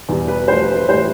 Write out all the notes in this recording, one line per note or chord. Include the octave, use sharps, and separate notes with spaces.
E2 B2 G3
B4
G2 F3 A3 C5
B4
B4
A2 E3 G3 C5